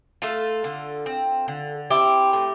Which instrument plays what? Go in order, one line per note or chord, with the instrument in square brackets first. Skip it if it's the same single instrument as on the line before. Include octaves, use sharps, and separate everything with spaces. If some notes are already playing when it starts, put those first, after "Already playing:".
[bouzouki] A3 F4 A4
D3
C4
D3
C4 E4 G4
A2